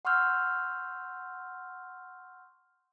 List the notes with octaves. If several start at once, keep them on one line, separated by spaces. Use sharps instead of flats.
F#5 C6 C#6 E6 F6 G6